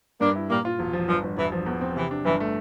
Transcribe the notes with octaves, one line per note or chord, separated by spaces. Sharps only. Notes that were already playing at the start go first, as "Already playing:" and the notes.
G2 A#3 D4
E4
A#2 G3 A#3
F4
E1
F3
G1 F3
G1
E1 E3
F3
E2
C4
C3 E3
D4
G1 E3
A3